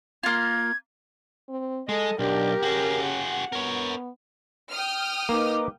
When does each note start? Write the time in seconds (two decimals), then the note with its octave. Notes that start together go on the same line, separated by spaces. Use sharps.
0.23 A#3 F4 G#6
1.48 C4
1.89 G#3 A4 D#5
2.19 B1 D4 G4 A#4
2.63 C#3 F#4 G#4
3.04 F#5
3.52 B3 A#4 C#5
4.72 G5 D#6 F6
5.29 A#3 D#4 B4 D6